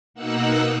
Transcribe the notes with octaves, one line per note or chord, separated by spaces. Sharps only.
B2 A#3 D#4 F#5 E6 F#6